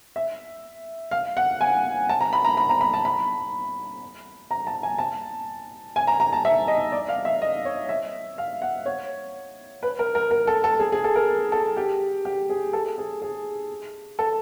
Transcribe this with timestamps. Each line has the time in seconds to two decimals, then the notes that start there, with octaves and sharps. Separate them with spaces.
0.16 E5
1.11 F5
1.37 F#5
1.61 G#5
2.09 A5
2.21 A#5
2.33 B5
2.44 A#5
2.57 B5
2.69 A#5
2.81 B5
2.94 A5
3.05 B5
4.51 A#5
4.67 A5
4.83 G#5
4.99 A5
5.96 G#5
6.07 A#5
6.20 A#5
6.33 A5
6.45 E5
6.68 D#5
6.92 D5
7.09 F5
7.25 E5
7.42 D#5
7.65 C#5
7.89 E5
8.38 F5
8.62 F#5
8.86 C#5
9.83 B4
9.99 A#4
10.15 A#4
10.31 A#4
10.47 A4
10.64 A4
10.79 G#4
10.92 G#4
11.04 A4
11.15 A#4
11.52 A4
11.77 G4
12.25 G4
12.50 G#4
12.73 A4
12.98 G#4
13.22 G#4
14.19 A4